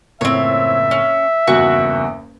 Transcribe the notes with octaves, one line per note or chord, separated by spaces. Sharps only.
F#1 F2 A2 C4 C#5 E5
C#4
F#1 E2 G2 F#4